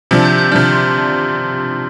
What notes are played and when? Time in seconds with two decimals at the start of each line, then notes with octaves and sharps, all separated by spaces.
0.11 C3 F3 D4
0.25 G6
0.38 G6
0.52 C3 F3 D4 F6
0.72 C6